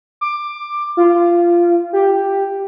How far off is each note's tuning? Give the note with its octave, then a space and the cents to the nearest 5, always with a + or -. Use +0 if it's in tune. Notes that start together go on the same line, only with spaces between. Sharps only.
D6 +15
F4 -15
G4 +5